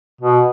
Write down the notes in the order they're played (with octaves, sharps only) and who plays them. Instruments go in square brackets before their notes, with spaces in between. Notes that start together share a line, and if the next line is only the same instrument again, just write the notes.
[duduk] B2